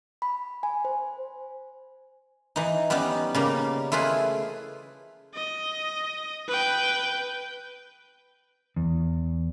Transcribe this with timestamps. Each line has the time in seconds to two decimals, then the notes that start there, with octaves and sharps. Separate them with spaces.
0.22 B5
0.63 G#5
0.85 C5
2.56 E3 D#4
2.90 G3 B3 C#4 D#4
3.35 C#3 G3 A#3
3.92 A3 E4 F4 G#4 B4
5.35 D#5
6.48 B4 G5
8.76 E2